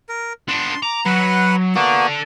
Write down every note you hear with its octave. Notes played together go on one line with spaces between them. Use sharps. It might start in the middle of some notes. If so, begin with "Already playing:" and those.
A#4
B3 D4 C6
A#5 D6
F#3 B4 F#5 B5
A#3 B3 F#4 A4 D5